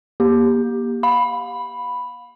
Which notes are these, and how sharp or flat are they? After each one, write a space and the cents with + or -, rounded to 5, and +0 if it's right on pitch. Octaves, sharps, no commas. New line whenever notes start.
A#3 +30 G4 +10
F5 +35 B5 +0